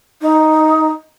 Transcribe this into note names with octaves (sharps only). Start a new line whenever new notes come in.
D#4